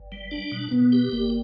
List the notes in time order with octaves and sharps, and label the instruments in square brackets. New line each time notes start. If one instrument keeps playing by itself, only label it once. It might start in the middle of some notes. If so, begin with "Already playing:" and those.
Already playing: [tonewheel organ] G1
G3
D4
B2
[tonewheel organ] B2 [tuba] B3
[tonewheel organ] G4
[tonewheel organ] G1 [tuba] A#3